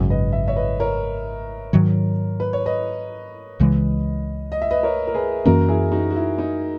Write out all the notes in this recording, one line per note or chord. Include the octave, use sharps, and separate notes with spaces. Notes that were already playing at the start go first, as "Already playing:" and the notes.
Already playing: G#1 F#2 C#3
B4 D#5
E5
C#5 E5
B4 D#5
A#4 C#5
G#2 D#3 F#3
B4
C#5
B4 D#5
C#2 C#3 E3 G#3
D#5
E5
B4 D#5
A#4 C#5
A#4
G#4 B4
F#2 E3 A#3 C#4 F#4 A#4
E4 G#4
D#4 F#4
F#4
E4
D#4